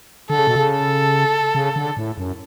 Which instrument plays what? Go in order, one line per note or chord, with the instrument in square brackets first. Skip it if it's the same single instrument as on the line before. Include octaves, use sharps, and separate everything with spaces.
[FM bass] D3 [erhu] A4
[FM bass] C#3
B2
C#3
[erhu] A4
[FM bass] C#3
D3
A2
F#2